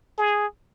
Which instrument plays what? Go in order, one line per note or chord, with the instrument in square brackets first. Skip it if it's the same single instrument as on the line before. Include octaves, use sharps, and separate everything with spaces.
[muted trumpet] G#4